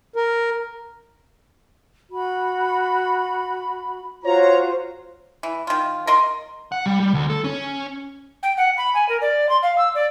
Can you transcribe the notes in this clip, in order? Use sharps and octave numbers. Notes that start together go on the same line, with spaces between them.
A#4
F#4 B5
F4 F#4 C5 C#5 A#5
E3
D#3 F4
A#4 D#5 C6
F#5
G3
G3
D2
A4
C#4
G5
F#5
B5
G#5
A#4
D5
C6
F5
E6
D5